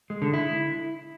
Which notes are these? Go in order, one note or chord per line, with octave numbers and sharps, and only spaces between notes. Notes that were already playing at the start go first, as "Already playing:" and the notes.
G#3
D3
E4